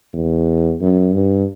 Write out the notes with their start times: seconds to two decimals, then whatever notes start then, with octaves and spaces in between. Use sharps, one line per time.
0.13 E2
0.81 F#2
1.14 G2